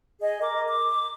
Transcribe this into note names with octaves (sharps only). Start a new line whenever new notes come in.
G#4 D#5
A#4 D6
D6